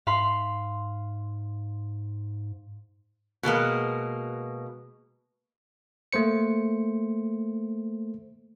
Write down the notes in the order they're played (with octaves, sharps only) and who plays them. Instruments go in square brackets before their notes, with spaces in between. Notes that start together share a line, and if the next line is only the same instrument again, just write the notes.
[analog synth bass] G#2 [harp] F5 B5 C6
[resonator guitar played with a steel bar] B2 G#3 A#3 B3
[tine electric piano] A3 A#3 C5 C#7